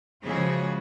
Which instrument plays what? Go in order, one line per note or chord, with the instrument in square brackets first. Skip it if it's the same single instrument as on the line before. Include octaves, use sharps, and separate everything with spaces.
[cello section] C#3 E3 F3 G#3 F#4 G#4